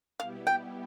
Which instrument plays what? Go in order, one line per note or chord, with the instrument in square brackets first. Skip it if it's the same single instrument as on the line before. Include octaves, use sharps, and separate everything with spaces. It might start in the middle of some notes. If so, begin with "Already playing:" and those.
[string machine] B2 G3 B3 E4 G4 [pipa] F5
[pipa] G5